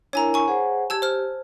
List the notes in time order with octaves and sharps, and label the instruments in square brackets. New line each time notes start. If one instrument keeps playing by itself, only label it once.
[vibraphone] D4 E4 A#4 [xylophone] C#5 G#5 A#5
[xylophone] G#5 C#6
[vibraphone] G#4 C5 F#5
[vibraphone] G4 [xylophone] A5 E6 G#6
[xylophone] C5 F6